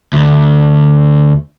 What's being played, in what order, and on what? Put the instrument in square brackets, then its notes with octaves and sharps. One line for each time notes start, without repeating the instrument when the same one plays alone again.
[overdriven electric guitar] D2